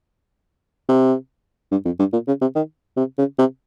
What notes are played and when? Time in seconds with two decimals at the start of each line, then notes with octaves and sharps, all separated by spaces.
0.89 C3
1.71 G2
1.85 F2
2.00 G2
2.13 A#2
2.28 C#3
2.41 C3
2.55 D#3
2.97 C3
3.18 C#3
3.39 C3